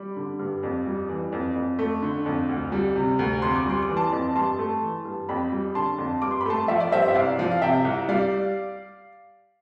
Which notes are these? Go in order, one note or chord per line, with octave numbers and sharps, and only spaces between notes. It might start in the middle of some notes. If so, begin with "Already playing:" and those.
Already playing: G3 B5 D6
D3
G2
F2
G3
E3
F2
F2
A3
D3
F2
D2
G3
C3
D2
F2 C6
D6
G3 C6
D6
E3
A5 C6
F2
G2 A5 C6
A3
E3
G2
F2 G5 B5
G3
D3 A5 C6
F2
G2 D6
C6
B5
A3 A5 C6
F3 E5
D5
G2 C5 E5
E5
C2 D5 F5
F3
F5
C3 E5 G5
C2
G3 D5 F5